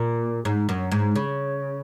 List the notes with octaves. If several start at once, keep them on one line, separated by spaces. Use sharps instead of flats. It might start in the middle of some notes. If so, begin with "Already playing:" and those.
Already playing: A#2
G#2
F#2
G#2
C#3